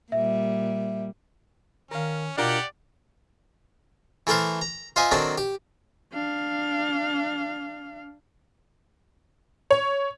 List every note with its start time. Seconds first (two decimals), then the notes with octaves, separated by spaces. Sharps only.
0.12 A#2 G3 E5
1.91 D#3 C#4 A#4 F5
2.37 B2 D4 F4 G4 A#4 D5 F#5
4.27 E3 A3 A4 A#4 C5
4.61 A#5
4.96 F4 C5 D#5 E5 G#5
5.11 D#3 F#3 C4 D4 A4
5.38 G4
6.13 D4 F5
9.71 C#5